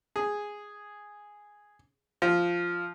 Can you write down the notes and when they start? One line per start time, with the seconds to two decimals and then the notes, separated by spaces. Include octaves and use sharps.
0.16 G#4
2.22 F3